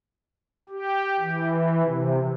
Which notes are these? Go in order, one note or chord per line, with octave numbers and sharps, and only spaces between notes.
G4
E3
C3